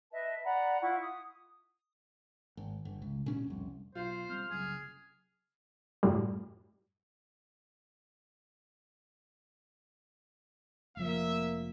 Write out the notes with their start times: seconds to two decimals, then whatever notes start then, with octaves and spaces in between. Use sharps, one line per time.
0.12 B4 D#5 E5 A5
0.44 D5 F#5 A#5 B5
0.81 E4 F4 F#5 C#6
1.00 D#6
2.57 G#1
2.85 G1
3.02 C#2
3.26 A#2 C#4
3.48 F1 C2
3.95 B1 F4 C5
4.29 G3 C4 F6
4.50 F#1 C2 F#2 G#4
6.03 F#2 A2 G3
10.97 F1 F3 A#3 E5